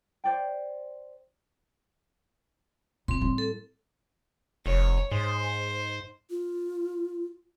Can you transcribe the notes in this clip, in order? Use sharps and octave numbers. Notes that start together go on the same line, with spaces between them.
C5 D5 G5
A#2 C4 C6
A2 G3
A4
F1 C#5
G#2 C5
F4